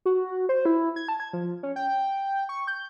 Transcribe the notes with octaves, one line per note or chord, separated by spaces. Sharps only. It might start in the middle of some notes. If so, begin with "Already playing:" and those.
F#4
C5
E4
G#6
A5
G#6
F3
C#4
G5
C#6
G6